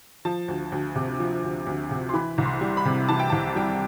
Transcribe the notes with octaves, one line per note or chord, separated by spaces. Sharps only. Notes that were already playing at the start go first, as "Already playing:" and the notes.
F3 A5
D2
D2
C3
F3
D2
D2
C3
C6
E3 B5
C2
C6
G3
B5
C3
E3 A5
G5
C2 A5
G3 G5